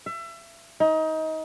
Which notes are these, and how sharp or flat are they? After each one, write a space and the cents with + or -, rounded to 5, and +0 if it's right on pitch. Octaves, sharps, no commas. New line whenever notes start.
E5 +30
D#4 +25